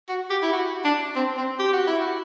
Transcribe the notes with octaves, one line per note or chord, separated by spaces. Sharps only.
F#4
G4
E4
F#4
D4
C4
C4
G4
F#4
E4
F#4